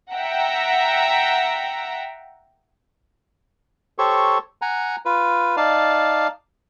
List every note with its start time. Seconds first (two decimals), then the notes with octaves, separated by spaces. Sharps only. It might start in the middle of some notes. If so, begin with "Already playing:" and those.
0.12 E5 F#5 G5 A#5
3.98 G4 A4 C5 C#5 C#6
4.62 F#5 G#5 A#5
5.05 F4 B4
5.57 D#4 D5 F5 A5